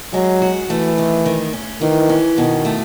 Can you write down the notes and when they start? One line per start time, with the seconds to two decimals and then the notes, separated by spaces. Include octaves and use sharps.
0.13 F#3 G#3
0.42 F#4
0.70 E3 A3
0.98 D#3
1.25 D#3
1.53 C#4
1.81 D#3 E3
2.09 C#4
2.36 B2 D#3
2.65 A3